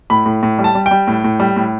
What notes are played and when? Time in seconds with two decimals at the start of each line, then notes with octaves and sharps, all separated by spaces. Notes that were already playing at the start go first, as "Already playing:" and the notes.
0.10 A2 B5
0.26 A2
0.43 A2
0.59 G3
0.64 A5
0.75 G3
0.86 G5
0.91 G3
1.08 A2
1.24 A2
1.40 G3
1.56 A2